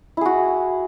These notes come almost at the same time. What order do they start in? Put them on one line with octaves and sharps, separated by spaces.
E4 G#4 F#4